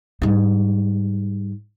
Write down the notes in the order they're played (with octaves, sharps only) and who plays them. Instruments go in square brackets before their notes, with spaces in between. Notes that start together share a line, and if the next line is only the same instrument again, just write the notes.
[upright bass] G#2 G3